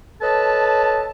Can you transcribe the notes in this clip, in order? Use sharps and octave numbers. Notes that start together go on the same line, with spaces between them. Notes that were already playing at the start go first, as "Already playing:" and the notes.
A4 B4 C#5 D#5 A5